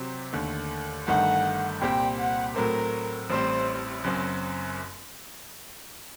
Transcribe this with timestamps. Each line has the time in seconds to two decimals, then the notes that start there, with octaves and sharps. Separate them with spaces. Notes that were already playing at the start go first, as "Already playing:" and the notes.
Already playing: C3 F#3 C4 G4
0.33 D#2 D3 A3
1.07 G1 G2 D#3 A3 F#5
1.81 C2 A#2 G3 C4 G4 G5
2.18 F#5
2.55 A2 F#3 A3 C4 A#4
3.30 A1 A2 G3 C4 C5
4.04 F#1 F#2 F#3 C4